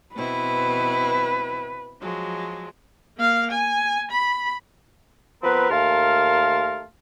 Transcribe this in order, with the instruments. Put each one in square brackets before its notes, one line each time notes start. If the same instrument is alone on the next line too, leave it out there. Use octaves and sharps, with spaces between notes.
[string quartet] B2 C4 E4 [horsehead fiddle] B4
[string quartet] F3 F#3 G#3
[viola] A#3 F5
G#5
B5
[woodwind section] F3 B3 C4 A#4 B4
D#2 A3 A#4 F5 A5 C6